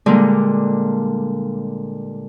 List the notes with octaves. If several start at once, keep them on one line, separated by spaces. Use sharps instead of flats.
A#2 D3 G3 G#3